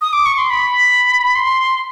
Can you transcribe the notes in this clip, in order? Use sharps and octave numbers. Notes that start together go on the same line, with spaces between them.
D#6
D6
C#6
C6
B5
C6